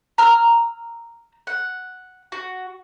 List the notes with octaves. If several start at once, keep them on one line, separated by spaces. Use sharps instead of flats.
A#5 E6 F6
F#5
F#4